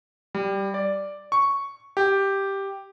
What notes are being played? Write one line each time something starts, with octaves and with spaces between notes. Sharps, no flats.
G3
D5
C#6
G4